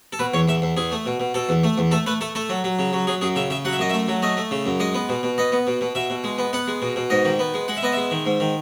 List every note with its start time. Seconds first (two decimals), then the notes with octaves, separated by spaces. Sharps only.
0.13 A4
0.19 B2 B4
0.34 E2 C#5
0.48 E2 E5
0.62 E2
0.77 E2 G#4
0.92 A3
1.06 B2
1.20 B2
1.34 B2 A4
1.49 E2
1.64 A3
1.78 E2
1.91 A3 A4
2.06 A3 B4
2.21 A3 A4
2.35 A3 A4
2.49 F#3
2.64 F#3
2.79 C#3
2.93 F#3
3.07 F#3 G#4
3.21 F#2 G#4
3.36 C#3 E5
3.50 C#3 E5
3.65 F#3 F#5
3.73 E5
3.79 F#2 D#5
3.89 A3 E5
4.08 F#3
4.22 A3 D#5
4.37 A3
4.51 C#3
4.66 F#2
4.80 G#3 D#5
4.94 B3
5.09 B2
5.23 B2
5.38 B3 D#5
5.52 B3
5.67 B2
5.81 B2
5.95 B2 E5
6.10 B2
6.24 G#3
6.38 B3
6.53 B3 F#5
6.67 G#3
6.82 B2
6.96 B2
7.10 G#2 D#5
7.25 D#3
7.39 B3
7.54 G#3
7.68 G#3 F#5
7.77 E5
7.83 B3 D#5
7.92 G#3 E5
8.11 D#3
8.26 G#2
8.40 D#3